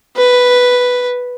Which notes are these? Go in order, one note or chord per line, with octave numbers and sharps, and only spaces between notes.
B4